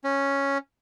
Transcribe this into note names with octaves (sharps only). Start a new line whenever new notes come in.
C#4